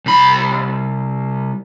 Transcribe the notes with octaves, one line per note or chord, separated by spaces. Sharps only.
C2 B5